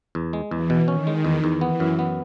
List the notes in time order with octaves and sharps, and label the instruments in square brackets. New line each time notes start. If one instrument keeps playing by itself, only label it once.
[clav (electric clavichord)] E2
G#3
[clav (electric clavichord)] E2 [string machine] E3
[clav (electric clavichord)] B2
[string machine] D#3 [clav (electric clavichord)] C#4
[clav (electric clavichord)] G#3
E2
E2
[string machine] E3 [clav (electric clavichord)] B3
[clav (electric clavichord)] F#2
B3